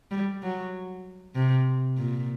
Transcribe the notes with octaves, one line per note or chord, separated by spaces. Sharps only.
G3
F#3
C3
A#2